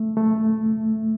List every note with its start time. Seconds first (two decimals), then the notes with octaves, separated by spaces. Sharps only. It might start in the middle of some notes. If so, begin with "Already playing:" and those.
Already playing: A3
0.17 A3